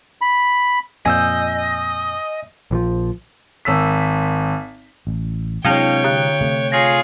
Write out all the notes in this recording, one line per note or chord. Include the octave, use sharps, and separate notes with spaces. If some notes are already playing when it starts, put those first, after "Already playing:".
B5
F2 A#2 D#5 G#5 E6 G6
A#1 E3 F3
G#1 E6 B6
A1
C3 F#3 G#3 C4 D4 E4 C#5 G5
D3 F#6
C3 A3
F4 G#4 C#5 A#6 C7